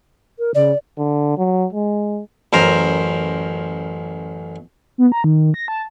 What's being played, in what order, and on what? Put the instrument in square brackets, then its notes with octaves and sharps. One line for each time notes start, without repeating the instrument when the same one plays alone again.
[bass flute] A#4
[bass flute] C#3 [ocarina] D5
[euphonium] D3
F#3
G#3
[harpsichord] A1 F#2 A#4 C5 A#5
[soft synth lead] B3
A#5
D#3
A#6
A5